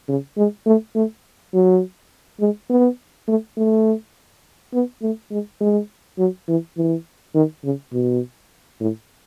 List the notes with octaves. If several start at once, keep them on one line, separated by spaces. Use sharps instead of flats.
C#3
G#3
A3
A3
F#3
G#3
B3
A3
A3
B3
A3
G#3
G#3
F#3
E3
E3
D#3
C#3
B2
A2